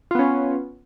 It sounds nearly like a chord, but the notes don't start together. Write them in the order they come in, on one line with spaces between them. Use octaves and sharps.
F4 B3 C#4